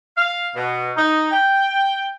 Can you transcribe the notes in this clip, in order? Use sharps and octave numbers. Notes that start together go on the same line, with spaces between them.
F5
B2
D#4
G5